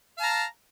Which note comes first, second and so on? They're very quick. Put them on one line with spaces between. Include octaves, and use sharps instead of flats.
F5 A5 A#5